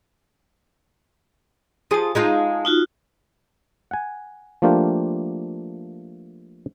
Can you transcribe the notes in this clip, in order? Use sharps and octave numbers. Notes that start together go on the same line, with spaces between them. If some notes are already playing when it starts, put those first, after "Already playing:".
F3 G#4 A5 D#6
G#3 D#4 F4
D#4 F4 F#4
F#5 G#5
F3 A3 A#3 D4 F4 G4